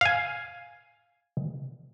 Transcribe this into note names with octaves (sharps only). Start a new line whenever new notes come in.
F5 G#5